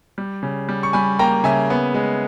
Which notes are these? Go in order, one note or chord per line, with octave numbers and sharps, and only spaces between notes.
G3
C#3
G3
C#6
G3 G#5 B5
A#3 G5 A#5
C#3 E5 G#5
B3
G#3